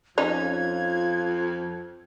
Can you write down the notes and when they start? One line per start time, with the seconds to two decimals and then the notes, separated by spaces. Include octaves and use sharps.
0.18 F2 C#4 D#4 F4 G#6